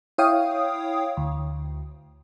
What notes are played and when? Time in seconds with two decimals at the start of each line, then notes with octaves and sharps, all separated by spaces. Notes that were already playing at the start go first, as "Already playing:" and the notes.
0.18 E4 C#5 F5 G5 D#6
1.17 D2